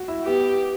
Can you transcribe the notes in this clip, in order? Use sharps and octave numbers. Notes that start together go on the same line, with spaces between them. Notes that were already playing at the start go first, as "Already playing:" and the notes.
Already playing: F#4
E4
B3 G4